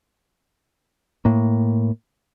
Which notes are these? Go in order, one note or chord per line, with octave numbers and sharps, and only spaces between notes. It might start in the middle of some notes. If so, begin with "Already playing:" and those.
A2 A#3